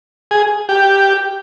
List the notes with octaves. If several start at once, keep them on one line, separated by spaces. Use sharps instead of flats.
G#4
G4